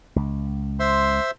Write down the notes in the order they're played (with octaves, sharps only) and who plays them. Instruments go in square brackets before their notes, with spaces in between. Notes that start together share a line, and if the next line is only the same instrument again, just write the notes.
[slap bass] C#2
[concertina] C5 E5 C6